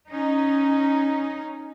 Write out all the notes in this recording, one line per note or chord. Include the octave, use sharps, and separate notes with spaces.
C#4 D#4